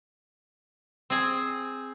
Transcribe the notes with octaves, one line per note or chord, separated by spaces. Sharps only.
C4 G#4